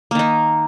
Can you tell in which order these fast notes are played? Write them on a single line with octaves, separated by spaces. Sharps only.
A#3 D#3 D#4